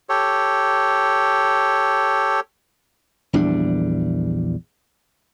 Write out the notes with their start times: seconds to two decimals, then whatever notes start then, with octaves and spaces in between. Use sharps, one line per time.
0.09 G4 A4 C#5
3.33 A#1 E2 G3 D4